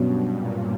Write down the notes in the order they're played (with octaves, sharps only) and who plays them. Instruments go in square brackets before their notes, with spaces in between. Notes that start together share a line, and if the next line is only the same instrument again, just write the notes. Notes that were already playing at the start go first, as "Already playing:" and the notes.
Already playing: [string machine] G2 [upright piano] B2 F#3 C#4
[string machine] A#2